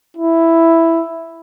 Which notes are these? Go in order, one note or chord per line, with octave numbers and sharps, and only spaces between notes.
E4